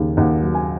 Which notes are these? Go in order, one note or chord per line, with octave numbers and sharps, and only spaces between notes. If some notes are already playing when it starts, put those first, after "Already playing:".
Already playing: D#2 C#3
D#2 F#5
F#3
G#5